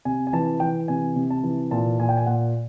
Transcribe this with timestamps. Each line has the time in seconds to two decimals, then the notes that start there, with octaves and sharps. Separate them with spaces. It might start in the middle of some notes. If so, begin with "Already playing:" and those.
0.05 C3 G#5
0.27 G#5
0.33 E3 A5
0.60 E3 G5
0.88 C3 G#5
1.16 C3
1.30 A5
1.43 E3
1.71 A#2 A5
1.99 A#2 G#5
2.09 G5
2.17 G#5
2.26 A#2 F#5